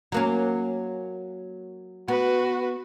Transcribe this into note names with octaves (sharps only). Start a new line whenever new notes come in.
F#3 A#3 C#4
B3 F#4 B4